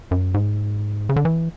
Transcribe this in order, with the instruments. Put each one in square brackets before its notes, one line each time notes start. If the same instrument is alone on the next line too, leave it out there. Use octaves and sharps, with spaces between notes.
[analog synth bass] F#2
G#2
C#3
D3
E3